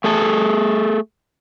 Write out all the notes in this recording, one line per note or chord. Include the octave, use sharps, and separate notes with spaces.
A3 G#4 A4